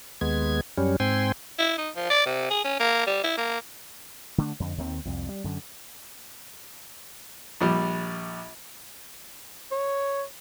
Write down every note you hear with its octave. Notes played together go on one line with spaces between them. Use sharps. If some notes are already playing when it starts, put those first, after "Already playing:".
D#2 G#3 B3 G#6
F#2 G3 C#4
G#2 C4 G5 G#5 C6
E4
D#4
F3
D5
C3
G#4
C#4
A#3
G3
E4
A#3
D3 A3 D4
F2 D3
D#2 D#3 A#3 C4
C2 F2
G3
F#2 D3
A#1 G3
C#5